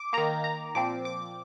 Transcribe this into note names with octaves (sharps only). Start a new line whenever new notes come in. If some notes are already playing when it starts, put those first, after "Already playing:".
Already playing: D6
D#3 A#3 A#5
A#5
A#2 F3 C4 D6
D6